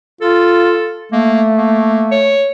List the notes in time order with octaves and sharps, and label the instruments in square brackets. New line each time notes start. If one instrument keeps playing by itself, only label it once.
[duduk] F4 [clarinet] A4
[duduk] A3 [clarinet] A#3
[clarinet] A#3
C#5